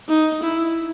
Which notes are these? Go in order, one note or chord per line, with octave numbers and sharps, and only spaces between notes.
D#4
E4